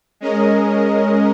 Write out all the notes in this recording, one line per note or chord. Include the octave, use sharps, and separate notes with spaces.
G#3 C#4 A#4 D#5